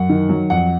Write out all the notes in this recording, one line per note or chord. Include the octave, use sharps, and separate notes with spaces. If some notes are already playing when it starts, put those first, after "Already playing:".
Already playing: F#2 F#5
D#3
F#3
F2 F#5